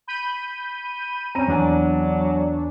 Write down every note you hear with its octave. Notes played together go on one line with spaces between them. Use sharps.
B5 G6 D#7
C4 C#4 A#5 D#7
E2 F#3 D4 G#5